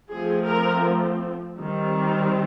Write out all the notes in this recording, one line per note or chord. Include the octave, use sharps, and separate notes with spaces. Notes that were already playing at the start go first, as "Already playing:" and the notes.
F3 A3 C4 G#4
A#4
D#3 G3 C4